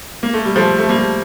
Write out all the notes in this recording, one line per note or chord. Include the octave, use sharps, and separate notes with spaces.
A#3
A3
G3
F3 A3
A3
G3 A#3